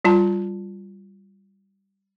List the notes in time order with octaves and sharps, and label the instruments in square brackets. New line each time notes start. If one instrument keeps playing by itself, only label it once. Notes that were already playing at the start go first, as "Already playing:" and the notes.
[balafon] G3 F4 A5 A#5